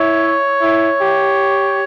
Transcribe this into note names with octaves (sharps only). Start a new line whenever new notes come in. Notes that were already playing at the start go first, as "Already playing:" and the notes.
Already playing: E4 C#5
E4
G4